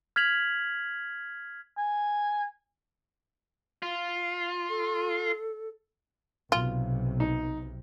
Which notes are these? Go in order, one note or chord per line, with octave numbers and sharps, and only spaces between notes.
F6 G#6 B6 F7 F#7
G#5
F4
A4
B1 C3 F4
D#4